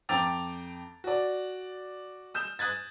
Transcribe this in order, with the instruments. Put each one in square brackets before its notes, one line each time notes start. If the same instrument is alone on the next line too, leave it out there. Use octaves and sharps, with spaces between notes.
[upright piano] F2 G5 A#5 D6 A6 F7
F#4 D5
D#6 G6 E7
D#6 F#6 G#6 A6